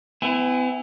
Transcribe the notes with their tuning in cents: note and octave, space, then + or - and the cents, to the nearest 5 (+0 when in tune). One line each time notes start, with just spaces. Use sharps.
B3 +40 E4 +0 G#5 -15